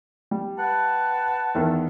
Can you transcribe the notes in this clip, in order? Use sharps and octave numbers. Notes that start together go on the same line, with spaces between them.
G3
B4 F#5 A5
E2 D#3 E3